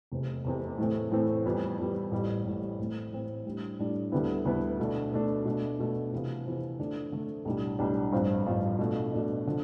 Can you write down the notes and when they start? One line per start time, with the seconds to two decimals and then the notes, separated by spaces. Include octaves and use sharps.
0.12 F1 E2 C3
0.45 F1 E2 C3
0.78 A2 E3 A3 C4
1.12 A2 E3 A3 C4
1.46 F2 E3 G3 B3
1.79 F2 E3 G3 B3
2.11 A1 A2 G3
2.45 A1 A2 G3
2.79 A2 E3 A3 C4
3.12 A2 E3 A3 C4
3.45 A2 G3 D4
3.79 A2 G3 D4
4.12 D2 D3 G3 B3 E4
4.45 D2 D3 G3 B3 E4
4.79 B2 A3 D4
5.12 B2 A3 D4
5.45 B2 A3 D4
5.79 B2 A3 D4
6.12 F2 C3 E3 B3 F4
6.45 F2 C3 E3 B3 F4
6.79 D3 A3 D4
7.12 D3 A3 D4
7.45 B1 A2 G3 D4
7.79 B1 A2 G3 D4
8.12 A1 G2 F3 C4 F4
8.46 A1 G2 F3 C4 F4
8.79 B2 A3 D4
9.13 B2 A3 D4
9.47 D3 F3